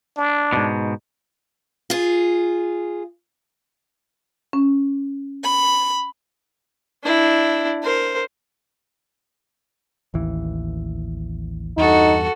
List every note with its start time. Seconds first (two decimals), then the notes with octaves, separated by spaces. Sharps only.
0.17 D4
0.53 G#2 B2
1.90 F4 G#4
4.53 C#4
5.44 B5
7.04 D4 E4
7.83 A#4 C5
10.14 A1 D#2 E3
11.77 E2 G2 D#4 F#4 A4